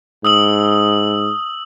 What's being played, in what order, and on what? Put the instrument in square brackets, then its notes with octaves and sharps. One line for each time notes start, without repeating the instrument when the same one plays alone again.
[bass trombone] G#2 [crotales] D#6 E6 F#7